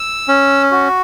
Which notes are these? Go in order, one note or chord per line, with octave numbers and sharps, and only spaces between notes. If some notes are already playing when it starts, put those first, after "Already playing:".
Already playing: E6
C#4
F#4